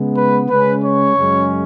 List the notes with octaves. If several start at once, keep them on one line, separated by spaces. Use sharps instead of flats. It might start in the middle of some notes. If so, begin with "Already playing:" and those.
Already playing: C#3 G#3 B3
B4
C#3 G#3 C#4 B4
C#5
F#2 C#3 G#3 C#4